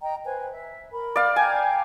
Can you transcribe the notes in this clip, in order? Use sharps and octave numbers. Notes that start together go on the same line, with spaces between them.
D#5 G5 A#5
B4 C5 G#5
E5
A#4 B5
D5 F5
G5 G#5 A#5 G6